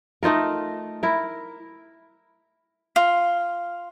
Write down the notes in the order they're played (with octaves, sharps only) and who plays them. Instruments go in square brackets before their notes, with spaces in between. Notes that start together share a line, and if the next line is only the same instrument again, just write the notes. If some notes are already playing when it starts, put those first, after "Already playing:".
[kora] A3 D#4 F4 A#4
E4 A#4
[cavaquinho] F4